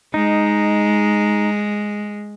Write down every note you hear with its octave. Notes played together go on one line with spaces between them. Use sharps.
G#3 D#4